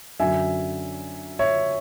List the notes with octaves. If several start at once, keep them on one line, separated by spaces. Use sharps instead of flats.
F#2 D3 F#3 E5 G#5
C#5 E5